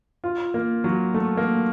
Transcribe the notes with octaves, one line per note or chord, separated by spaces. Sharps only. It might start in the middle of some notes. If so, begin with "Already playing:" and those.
F4
A#3
F#3
A3
A#3